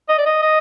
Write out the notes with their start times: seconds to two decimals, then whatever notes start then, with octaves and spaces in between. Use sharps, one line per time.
0.09 D#5
0.18 D5
0.26 D#5
0.42 D#5